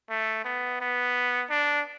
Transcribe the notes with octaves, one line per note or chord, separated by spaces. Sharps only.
A3
B3
B3
D4